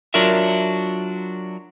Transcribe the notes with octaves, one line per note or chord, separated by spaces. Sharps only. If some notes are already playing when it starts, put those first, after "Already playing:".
F#3 D4 F4 A#4 E5